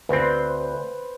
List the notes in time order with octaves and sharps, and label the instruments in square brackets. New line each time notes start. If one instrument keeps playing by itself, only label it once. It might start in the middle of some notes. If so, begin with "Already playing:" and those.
[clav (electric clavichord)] D2 C4 [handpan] B4 C5